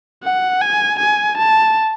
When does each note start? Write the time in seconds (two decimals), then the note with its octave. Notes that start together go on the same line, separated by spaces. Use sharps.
0.23 F#5
0.61 G#5
0.99 G#5
1.38 A5